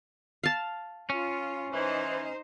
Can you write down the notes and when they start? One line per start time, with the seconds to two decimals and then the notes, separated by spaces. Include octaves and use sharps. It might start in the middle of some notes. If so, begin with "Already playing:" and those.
0.44 F5 A5
1.10 C#4 F4
1.73 E3 D#4 C5